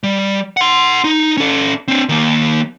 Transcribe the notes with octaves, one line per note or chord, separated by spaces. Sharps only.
G3
F#5 C6
D#4
C#4 A4
C4 D4
D#3 A#3